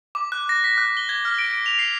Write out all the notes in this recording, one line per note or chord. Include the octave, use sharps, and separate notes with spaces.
D6
F#6
A#6
B6
F#6
G7
G#6
F6
D7
D7
F7
C7